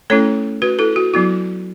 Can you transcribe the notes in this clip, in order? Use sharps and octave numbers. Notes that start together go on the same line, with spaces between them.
A3 C#4 E4 A4 C#5
F#4 B4
E4 A4
F#4
F#3 B3 E4 F#4